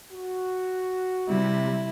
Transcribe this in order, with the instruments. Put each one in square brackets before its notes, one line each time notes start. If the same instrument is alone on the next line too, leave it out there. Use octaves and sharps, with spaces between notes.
[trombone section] F#4
[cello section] C3 [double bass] G3 [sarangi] E4